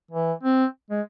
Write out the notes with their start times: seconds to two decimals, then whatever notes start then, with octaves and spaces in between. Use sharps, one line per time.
0.11 E3
0.43 C4
0.90 G#3